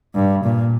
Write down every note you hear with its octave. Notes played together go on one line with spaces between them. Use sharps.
G2
A#2